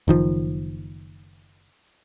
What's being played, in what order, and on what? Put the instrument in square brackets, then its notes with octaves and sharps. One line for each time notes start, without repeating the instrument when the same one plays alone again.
[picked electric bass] F#1 D#3 F3